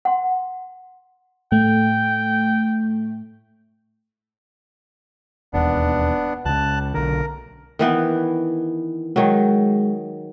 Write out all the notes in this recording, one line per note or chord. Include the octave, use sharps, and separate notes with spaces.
F#5 C6
A2 A3 G5
E1 D#2 B3 D4
C#2 C#3 A5 F#6
B1 D3 A#4
D#3 E3 B3
D#3 F#3 G#3